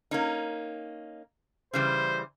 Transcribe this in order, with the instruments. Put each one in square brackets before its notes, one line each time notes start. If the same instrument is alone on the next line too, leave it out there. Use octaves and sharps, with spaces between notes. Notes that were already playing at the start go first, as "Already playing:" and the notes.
[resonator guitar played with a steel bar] A#3 C#4 D#4
[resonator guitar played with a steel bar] C#3 E3 G3 [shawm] C5